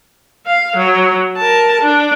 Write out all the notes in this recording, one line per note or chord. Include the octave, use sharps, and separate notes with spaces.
F5
F#3
A#4 A5
D4